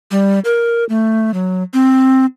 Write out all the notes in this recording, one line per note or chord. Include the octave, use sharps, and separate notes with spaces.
G3
A#4
A3
F#3
C4